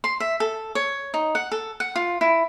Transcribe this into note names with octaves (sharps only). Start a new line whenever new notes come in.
C6
E5
A4
C#5
D#4
F#5
A4
F#5
F4
E4